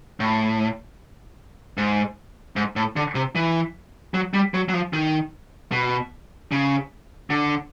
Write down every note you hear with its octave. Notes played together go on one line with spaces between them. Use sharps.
A2
G#2
G#2
A2
D3
C3
E3
F#3
G3
F#3
F#3
F3
D#3
B2
C#3
D3